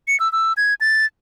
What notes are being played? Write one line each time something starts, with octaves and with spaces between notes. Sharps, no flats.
C#7
E6
E6
G#6
A6